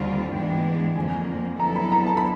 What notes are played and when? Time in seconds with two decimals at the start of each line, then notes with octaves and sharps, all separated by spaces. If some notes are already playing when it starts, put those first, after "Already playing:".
Already playing: D#2 D3 G3 C4 F4
0.32 G#2 E3 G#3 B3 D4 G5
0.96 F2 D3 F3 A#3 G#5
1.59 F#3 B3 E4 A4 A#5
1.76 B5
1.92 A#5
2.07 A5
2.17 B5